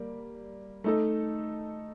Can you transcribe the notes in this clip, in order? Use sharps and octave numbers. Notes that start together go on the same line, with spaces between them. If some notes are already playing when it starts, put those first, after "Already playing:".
Already playing: G3 A#3
A3 D#4 A4